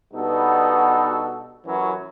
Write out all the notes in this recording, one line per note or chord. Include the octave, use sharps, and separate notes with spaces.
G2 B2 B3 D#4 F#4 A4
A1 F#2 E3 F#3 C#4 B4